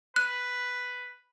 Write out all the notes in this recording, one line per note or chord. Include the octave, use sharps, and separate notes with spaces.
B4 F#6